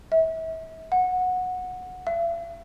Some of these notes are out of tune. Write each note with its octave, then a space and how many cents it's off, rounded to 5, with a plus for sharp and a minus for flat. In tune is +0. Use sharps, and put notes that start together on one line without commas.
E5 -35
F#5 -15
E5 +45